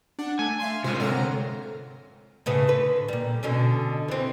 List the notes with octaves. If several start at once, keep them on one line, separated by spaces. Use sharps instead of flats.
D4 F#5
A3 G#5
E5 F5 C6
G#2 C3 G#3 F4 C5
D3 F#3 C4 A#5 F6
A2 C#3 B4
D3 B4
A#2 G3
B2 D3 C#4
E3 C4